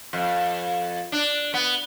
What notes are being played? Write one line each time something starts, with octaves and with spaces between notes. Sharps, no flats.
F2
D4
B3